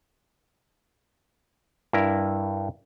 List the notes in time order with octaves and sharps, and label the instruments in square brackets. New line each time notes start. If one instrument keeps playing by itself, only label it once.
[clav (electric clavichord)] G2 E4 A#4